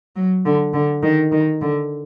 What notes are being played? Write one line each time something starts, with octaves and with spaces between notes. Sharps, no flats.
F#3
D3
D3
D#3
D#3
D3